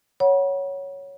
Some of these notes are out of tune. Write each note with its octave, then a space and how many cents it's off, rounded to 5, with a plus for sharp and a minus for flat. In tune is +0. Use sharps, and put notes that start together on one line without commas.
C#5 +0 F#5 +0 B5 -40